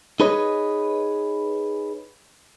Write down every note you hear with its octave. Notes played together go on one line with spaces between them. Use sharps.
D#4 G#4 B4 C#5 D#5